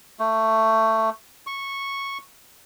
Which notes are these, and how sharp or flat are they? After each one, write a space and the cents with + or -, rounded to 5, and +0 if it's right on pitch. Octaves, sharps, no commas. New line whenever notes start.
A3 +15
C#6 -10